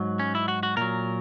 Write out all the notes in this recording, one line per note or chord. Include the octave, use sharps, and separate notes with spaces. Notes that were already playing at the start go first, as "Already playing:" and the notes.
Already playing: G#2 F#3
C#4
E4
F#4
F#4
A#2 F#3 A#4